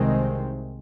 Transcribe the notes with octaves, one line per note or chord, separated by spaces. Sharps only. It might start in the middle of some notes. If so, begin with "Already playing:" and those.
Already playing: C2 C3 D#3 G#3 C4